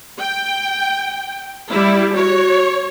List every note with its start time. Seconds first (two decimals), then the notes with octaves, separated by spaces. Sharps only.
0.18 G5
1.70 G3 E4
2.16 F#4 C#5